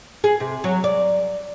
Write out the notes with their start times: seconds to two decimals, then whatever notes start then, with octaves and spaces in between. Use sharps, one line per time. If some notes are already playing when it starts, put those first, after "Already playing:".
0.24 G#4
0.40 C3
0.64 F#3
0.84 D5